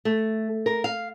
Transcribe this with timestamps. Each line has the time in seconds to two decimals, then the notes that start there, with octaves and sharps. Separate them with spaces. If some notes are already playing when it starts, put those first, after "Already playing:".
0.05 A3
0.66 A#4
0.84 F5